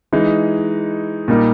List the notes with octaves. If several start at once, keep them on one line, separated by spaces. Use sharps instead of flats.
E3 G#3 D#4
A#2 G3 A#3 D#4